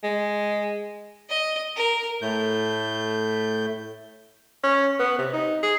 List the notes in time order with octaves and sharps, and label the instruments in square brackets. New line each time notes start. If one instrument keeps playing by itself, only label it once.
[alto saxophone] G#3
[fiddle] D#5
A#4
[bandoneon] A2 A3 G6
[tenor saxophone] C#4
B3
C3
D#4
G#4